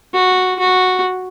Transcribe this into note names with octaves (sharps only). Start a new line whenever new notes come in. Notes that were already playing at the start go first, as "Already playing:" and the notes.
F#4
F#4